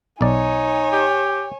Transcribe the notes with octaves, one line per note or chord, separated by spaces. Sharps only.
B1 D#4 C#5 D5 G#5
G4